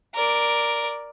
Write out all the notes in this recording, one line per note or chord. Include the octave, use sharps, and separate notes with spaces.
A#4 D5